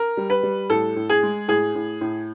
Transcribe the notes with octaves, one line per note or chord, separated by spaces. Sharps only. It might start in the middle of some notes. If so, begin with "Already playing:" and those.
Already playing: A#4
G3
B4
G3
A2 A4
A2
G#4
G#3
A2 G#4
A2
A2